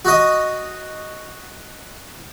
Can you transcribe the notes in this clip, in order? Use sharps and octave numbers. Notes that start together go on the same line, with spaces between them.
F#4 D#5